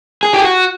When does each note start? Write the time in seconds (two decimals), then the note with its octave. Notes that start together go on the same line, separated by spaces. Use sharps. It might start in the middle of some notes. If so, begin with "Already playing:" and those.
0.23 G#4
0.34 G4
0.44 F#4